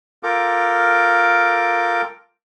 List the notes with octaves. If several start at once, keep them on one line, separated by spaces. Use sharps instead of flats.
F4 A4 A#4 G5 D6